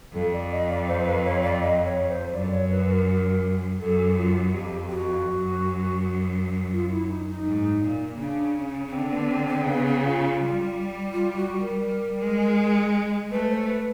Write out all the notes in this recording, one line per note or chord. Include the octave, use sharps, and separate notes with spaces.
F2 A4
D5
D#5
D5
C5
B4
C#5
D5
D#5
C#5
C5
F#2 D5
C#5
B4
A#4
F#2 A4
F4
F2 G4
F#4
F#2
F4
E4
D#4
D#4
G#2
A#2
C#3 D4
C#4
C#4
D3 C4
B3
C4
C4
C#3 B3
F4
G3
F4
F#4
A#4
G3
G#3
A3 B4
C5
B4